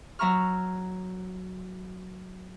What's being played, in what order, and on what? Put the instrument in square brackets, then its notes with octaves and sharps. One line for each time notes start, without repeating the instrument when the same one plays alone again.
[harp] F#3 E5 A#5 C#6 F6